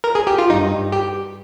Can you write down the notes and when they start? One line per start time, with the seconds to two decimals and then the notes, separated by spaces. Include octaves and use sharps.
0.04 A#4
0.15 G#4
0.27 G4
0.38 F4
0.50 G2 D#4
0.92 G4